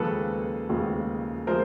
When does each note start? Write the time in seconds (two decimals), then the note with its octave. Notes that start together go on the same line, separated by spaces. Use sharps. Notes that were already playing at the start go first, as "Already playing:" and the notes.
Already playing: D#2 C#3 F3 G#3 A4 B4
0.69 D#2 C#3 F3 G#3
1.47 F3 G#3 A#4 C5